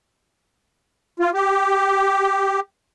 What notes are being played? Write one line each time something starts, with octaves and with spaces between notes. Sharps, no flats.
F4
G4